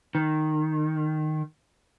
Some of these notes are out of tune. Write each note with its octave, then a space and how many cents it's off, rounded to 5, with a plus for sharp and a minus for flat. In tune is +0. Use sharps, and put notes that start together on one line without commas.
D#3 -10